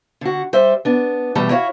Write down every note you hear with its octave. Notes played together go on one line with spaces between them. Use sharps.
D3 F#4
G3 C5 E5
B3 D4
B2 E3 G3 A3 A5
E4 F#4 C#5 F5